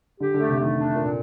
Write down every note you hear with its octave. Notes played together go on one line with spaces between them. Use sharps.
D3 G4
D3
A3
C3
D#3 A3
D4
A#2